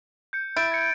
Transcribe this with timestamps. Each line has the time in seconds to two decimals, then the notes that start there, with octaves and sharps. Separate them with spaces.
0.33 G6 C#7
0.57 E4 G6 A6 D7
0.72 G#6 C#7